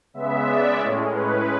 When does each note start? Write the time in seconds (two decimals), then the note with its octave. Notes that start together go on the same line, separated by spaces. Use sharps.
0.14 C#3 G#3 B3 E5
0.46 D5
0.79 A2 G#3 C#4 C#5
1.11 B4